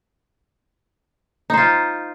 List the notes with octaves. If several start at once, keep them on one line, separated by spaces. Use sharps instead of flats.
D#4 F4 C5